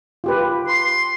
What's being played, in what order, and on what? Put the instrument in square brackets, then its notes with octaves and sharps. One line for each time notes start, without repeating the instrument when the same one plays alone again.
[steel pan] F4 G4 B4
[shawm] C6